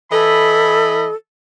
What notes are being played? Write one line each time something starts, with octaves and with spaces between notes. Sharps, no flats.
E3 A4 D#5 B5